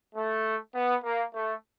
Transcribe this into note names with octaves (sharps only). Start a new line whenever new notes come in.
A3
B3
A#3
A3